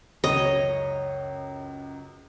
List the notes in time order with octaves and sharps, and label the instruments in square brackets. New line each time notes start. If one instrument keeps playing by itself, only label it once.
[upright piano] C#2 F#2 [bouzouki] C#5 [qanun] D#5